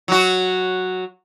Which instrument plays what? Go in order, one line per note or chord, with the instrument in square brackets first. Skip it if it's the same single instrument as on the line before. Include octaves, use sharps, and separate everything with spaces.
[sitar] F#3 F#4